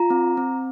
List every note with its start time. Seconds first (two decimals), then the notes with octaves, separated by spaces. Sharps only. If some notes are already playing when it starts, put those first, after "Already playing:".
Already playing: F4 A#5
0.10 C4
0.37 C4